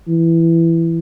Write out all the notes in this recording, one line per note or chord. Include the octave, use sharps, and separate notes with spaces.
E3